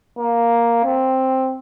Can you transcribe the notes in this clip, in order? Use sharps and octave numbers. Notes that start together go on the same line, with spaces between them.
A#3
C4